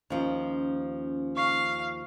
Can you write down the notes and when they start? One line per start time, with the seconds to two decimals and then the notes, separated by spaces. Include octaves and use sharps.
0.10 D#2 F3 C#4
1.37 F5 C#6 C7